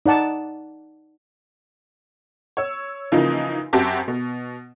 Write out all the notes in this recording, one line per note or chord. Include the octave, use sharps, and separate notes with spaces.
D#4 D5 F#5 A5
C#5 E6
C#3 E3 F3 A#3 D#4
F#2 C4 F#4 G4 A5
B2